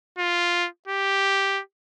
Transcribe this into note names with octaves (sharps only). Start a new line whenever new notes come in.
F4
G4